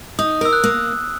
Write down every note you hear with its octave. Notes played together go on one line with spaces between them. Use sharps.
D#4 D#6
A#4 E6
F#6
A#3